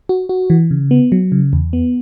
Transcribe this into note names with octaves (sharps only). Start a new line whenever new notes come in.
F#4
F#4
E3
C#3
B3
F#3
C#3
E2
B3